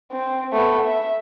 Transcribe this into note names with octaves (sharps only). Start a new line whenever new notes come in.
C4
A3 B3
E5